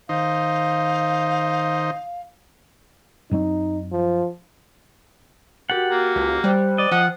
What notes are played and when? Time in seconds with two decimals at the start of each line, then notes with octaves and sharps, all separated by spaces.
0.09 D#3 D#4 C5 F5
3.31 F#2 F#3 C4 D#4
3.92 F3
5.70 F#4 G4 A#4 F#5 A6
5.91 A#3 F#4
6.16 C#2
6.44 G3 C5 G5 F#6
6.78 D5 D#5
6.91 F3 F#5